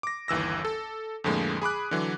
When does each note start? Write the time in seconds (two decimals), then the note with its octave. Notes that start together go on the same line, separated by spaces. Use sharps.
0.03 D6 A#6
0.28 G1 D#2 E3 E6 A#6
0.65 A4
1.24 F2 A2 D3 F3 G#3 A#3
1.62 G#4 B5 D6 F#6
1.91 D3 E3 F#3